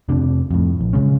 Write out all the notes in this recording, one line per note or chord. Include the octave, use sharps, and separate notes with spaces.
F1 F2 C3 D4
F2 A2
A#1
C#3 G#3 C#4